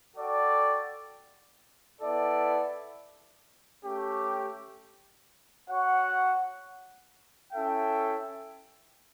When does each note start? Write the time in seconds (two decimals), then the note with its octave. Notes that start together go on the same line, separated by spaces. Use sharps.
0.15 F#4 A4 D5 G5
2.00 B3 E4 A4 D5
3.85 A3 C#4 G4
5.69 F#4 C#5 F#5
7.53 C#4 E4 A4 E5 G5